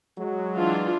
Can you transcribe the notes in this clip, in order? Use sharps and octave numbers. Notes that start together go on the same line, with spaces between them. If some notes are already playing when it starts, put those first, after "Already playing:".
F#3 G#3
E3 D4 F4